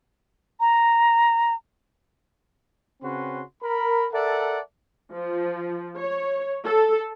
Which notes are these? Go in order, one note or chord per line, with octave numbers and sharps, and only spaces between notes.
A#5
C#3 C4 C#4 F#4 B4 C6
A#4 B5
A4 A#4 D5 E5 F#5 A5
F3
C#5
A4